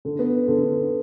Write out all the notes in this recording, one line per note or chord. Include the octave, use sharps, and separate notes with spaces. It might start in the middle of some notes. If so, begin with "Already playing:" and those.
D3
B3
D3
D3